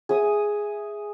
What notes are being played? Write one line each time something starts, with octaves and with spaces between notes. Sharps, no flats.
G#4 E5 D#6